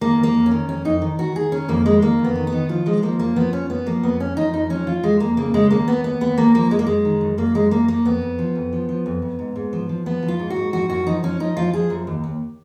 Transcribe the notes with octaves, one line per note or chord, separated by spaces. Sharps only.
D#3 A#3
F2
A#3
F2
C#4
D#3
F2 C#4
F2 D#4
D#3
D#3 F#4
D#3 G#4
D#3 C#4
F2 A#3
F2 G#3
D#3 A#3
F2
B3
D#3
B3
D#3
F3 F4
F3 G#3
F3 A#3
F#2 A#3
F3 B3
F#2 C#4
F#2 B3
F3 A#3
F2 B3
F2 C#4
F3 D#4
F2 D#4
F3 C#4
F3 F4
F2 G#3
F2 A#3
C#3 A#3
C#3 G#3
D#2 A#3
D#2 B3
D#2 B3
D#2 B3
D#2 A#3
F3 A#3
F#2 G#3
A#3
F#2 G#3
D#3
F#2
F#2 A#3
F#2 G#3
F#2 A#3
F#2 A#3
F2 B3
F2
F3
F2
F3
F3
F2
F2
G#2
G#2
F3
F3
F3 B3
F3
F4
G#2
F#4
G#2
F3 F#4
F#2 F#4
F3 D#4
F3 C#4
F3 D#4
F3 F4
F3 G#4
F#2
D#2
D#2